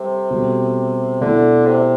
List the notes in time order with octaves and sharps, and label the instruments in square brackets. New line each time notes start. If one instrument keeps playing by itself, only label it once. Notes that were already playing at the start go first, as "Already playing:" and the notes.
Already playing: [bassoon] C3 [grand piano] G3 A4
[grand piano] B2 G3 C4 F#4 A4
[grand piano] B2 A3 E4 A4 [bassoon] D3
[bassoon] C3